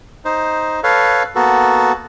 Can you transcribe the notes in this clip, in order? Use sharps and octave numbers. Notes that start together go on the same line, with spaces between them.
D#4 C5
A4 B4 C#5 F5
A#3 B3 F#4 A4